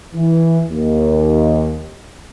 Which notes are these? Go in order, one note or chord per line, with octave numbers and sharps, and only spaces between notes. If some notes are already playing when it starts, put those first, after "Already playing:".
E3
D#2